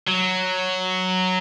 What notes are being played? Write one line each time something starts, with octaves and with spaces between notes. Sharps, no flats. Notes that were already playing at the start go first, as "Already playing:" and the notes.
F#3